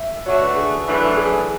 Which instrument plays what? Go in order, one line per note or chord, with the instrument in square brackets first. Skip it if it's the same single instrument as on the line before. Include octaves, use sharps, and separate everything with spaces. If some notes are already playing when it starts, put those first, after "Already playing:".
Already playing: [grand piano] E5
[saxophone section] D3 A3 D4 F#4 [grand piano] C#5
[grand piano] B4
G#4
[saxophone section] F#2 E3 A3 D4 [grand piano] B4
[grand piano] A4
G#4